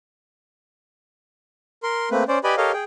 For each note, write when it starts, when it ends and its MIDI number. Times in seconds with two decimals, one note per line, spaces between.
1.83 2.09 70
1.83 2.09 84
2.11 2.24 57
2.11 2.24 58
2.11 2.24 60
2.11 2.24 71
2.28 2.39 61
2.28 2.39 72
2.28 2.39 74
2.44 2.55 67
2.44 2.55 71
2.44 2.55 74
2.44 2.55 75
2.44 2.55 80
2.44 2.55 83
2.57 2.72 67
2.57 2.72 69
2.57 2.72 70
2.57 2.72 73
2.57 2.72 75
2.57 2.72 77
2.73 2.84 68
2.73 2.84 79